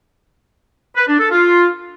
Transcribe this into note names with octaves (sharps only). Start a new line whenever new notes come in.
B4
D4
A4
F4